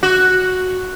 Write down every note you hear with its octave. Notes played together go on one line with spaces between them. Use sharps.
F#4